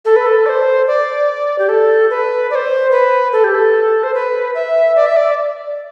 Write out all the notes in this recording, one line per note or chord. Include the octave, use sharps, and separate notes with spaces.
A4
B4
A4
D5
C5
D5
G4
A4
B4
D5
C5
B4
A4
G4
A4
C5
B4
E5
D5
E5
D5